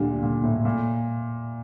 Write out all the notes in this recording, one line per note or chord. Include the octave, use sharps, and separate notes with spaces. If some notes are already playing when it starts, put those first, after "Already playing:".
Already playing: D2 A#2 D3 G3
A#2
A2
A#2